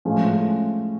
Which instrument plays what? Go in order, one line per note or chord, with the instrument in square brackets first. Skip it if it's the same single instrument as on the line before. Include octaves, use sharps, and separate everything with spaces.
[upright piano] A2 F3 G#3 C#4